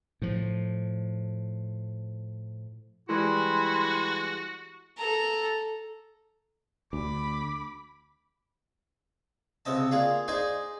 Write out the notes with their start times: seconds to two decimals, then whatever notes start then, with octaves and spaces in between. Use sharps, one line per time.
0.22 A2 F3
3.09 E3 G3 G#3 E4 F#4 C6
4.98 A4 A#5
6.93 D2 B5 D6
9.65 C#2 C3 C4 D#5 A5
9.91 A#3 F4 G#4 D5 F5
10.28 D#4 G#4 C5 D5 G#5 D6